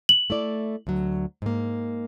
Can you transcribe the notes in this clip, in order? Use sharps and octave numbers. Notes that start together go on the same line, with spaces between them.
F#7
A3 E4 D5
D2 F#3
G#2 A#3